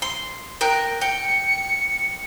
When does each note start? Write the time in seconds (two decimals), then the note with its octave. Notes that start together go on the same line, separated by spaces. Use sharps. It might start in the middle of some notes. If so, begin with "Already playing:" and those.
0.02 C6
0.61 A#4 G5 F#6
1.01 G5 C#7